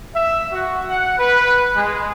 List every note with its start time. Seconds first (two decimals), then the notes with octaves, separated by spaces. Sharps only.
0.15 E5
0.53 F#4
0.88 F#5
1.19 B4
1.76 G#3